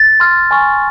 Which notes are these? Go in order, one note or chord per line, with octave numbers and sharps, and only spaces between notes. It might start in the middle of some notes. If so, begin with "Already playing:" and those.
Already playing: A6
C6 F6
G#5 C#6 F6